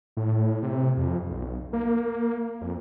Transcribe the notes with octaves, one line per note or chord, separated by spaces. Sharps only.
A2
C3
F2
B1
A#3
F2